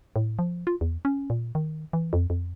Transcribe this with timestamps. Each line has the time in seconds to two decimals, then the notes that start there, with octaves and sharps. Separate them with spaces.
0.16 A2
0.39 F3
0.67 F4
0.81 E2
1.05 C#4
1.30 A#2
1.55 D#3
1.93 E3
2.13 F2
2.30 F2